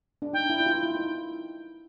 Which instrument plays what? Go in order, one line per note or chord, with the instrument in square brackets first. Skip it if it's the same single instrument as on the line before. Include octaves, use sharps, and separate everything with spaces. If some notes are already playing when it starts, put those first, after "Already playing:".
[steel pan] D4
[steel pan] D#4 [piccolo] G5
[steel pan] E4
E4
F4
E4
D#4